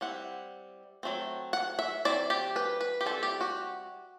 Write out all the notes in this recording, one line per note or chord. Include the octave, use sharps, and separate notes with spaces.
G3 C4 E4 F#5
F#3 A3 C4
F#5
E5
F#3 C4 E4 D5
G4
B4
B4
G4
G3 C4 E4 A4
G4
F#4